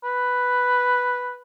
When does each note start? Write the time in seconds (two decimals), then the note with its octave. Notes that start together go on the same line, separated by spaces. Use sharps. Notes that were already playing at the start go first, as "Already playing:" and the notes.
0.04 B4